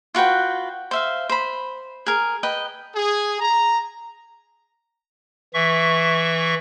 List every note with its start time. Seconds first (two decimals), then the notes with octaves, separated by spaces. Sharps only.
0.15 F4 F#4 B4 G5
0.91 C5 E5 F5
1.29 C5 B5
2.06 G#4 A#4
2.43 B4 D#5 G5
2.95 G#4
3.40 A#5
5.54 E3 E5 C#6